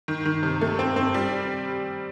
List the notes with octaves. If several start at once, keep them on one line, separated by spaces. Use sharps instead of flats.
D#3
D#3
C3
A3
C4
C4
G3